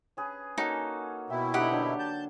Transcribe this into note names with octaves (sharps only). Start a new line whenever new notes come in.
C#4 G#4 B4
A#3 C#4 D#4 F#4 A4
B2 E4 G5
D3 D#4 G4 F#5 B5
D3 F#3
A5 G6